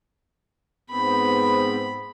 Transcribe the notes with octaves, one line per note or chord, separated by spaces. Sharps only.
G#2 B3 C4 B5